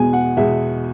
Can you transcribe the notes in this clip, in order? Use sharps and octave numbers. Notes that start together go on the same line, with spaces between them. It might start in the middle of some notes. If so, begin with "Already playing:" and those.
Already playing: E2 B2 G#3 G#5
F#5
E2 B2 G#3 E5